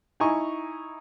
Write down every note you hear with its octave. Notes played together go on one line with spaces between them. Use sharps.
D#4 E4 G#5 A#5 C#6